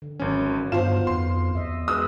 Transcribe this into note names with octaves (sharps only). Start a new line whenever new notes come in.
D3
G#1 D#3 F#3 C#4
G2 B3 F4 C5 E7
F2 C6
E2 D#5 E5
G#3 G#4 B4 D#6 E6